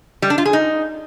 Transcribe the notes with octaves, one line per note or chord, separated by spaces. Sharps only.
G3
D4
F4
G#4
D#4